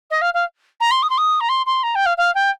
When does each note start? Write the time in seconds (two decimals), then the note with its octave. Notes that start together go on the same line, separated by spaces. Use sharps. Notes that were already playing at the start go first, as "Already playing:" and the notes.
0.10 D#5
0.21 F5
0.34 F5
0.80 A#5
0.91 C6
1.02 D#6
1.09 C6
1.18 D#6
1.40 A#5
1.49 C6
1.66 C6
1.83 A#5
1.95 G5
2.06 F5
2.17 F5
2.35 G5